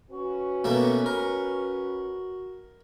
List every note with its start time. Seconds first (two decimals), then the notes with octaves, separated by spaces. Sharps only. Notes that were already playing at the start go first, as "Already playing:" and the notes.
0.10 C#4 F#4 B4
0.64 B2 A3 A#3
1.06 A#4